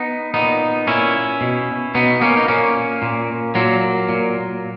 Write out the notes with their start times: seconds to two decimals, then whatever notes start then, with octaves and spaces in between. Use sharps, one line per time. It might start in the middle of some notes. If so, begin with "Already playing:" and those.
Already playing: B3 D#4
0.34 A#2 B3 D#4
0.87 A#2 C#4 E4
1.41 B2
1.95 B2 B3 D#4
2.21 A#3 C#4
2.37 D#4
2.48 A#2 A#3 C#4
3.02 A#2
3.55 A#2 F#3 A#3
4.09 A#2